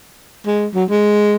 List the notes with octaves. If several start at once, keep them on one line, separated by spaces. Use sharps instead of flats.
G#3
F#3
G#3